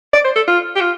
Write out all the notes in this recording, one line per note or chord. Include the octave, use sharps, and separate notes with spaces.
D5
C5
A4
F4
G4
F4